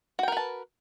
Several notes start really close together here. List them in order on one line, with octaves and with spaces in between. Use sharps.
F#4 G5 A#4 B4 A5